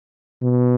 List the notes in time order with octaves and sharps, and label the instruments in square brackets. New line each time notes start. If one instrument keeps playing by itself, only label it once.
[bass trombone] B2